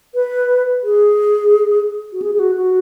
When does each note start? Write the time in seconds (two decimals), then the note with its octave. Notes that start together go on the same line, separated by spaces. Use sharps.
0.14 B4
0.84 G#4
2.13 F#4
2.22 G#4
2.35 G#4
2.39 F#4
2.57 F#4